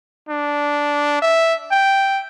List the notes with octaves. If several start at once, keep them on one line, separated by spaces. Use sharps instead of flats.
D4
E5
G5